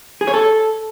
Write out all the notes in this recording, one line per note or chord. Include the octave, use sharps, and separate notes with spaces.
G#4
C#5
A4